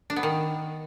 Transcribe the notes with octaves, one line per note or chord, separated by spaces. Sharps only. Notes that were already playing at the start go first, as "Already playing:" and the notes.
D4
B3
D#3